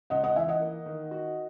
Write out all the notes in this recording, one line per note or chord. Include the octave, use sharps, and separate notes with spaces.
C#2 D#5 F#5
D#5 F#5
E3 E5 G#5
D#5 F#5
A#3
D#3
F#4